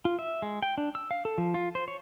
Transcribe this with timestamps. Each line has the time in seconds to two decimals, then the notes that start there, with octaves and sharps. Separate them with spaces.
0.05 F4
0.19 E5
0.42 G#3
0.63 G5
0.78 D4
0.95 E6
1.11 F5
1.25 A4
1.38 F3
1.54 F4
1.75 C5
1.88 C#5